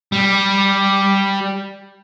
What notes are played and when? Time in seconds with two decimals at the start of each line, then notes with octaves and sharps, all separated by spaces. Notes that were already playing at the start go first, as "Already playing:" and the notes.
0.12 G3